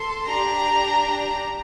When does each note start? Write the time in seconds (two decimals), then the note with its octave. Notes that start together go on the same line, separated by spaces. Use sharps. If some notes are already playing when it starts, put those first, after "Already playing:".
Already playing: A4 C6
0.26 D4 G4 A#5